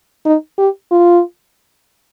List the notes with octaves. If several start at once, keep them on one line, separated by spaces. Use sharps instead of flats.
D#4
G4
F4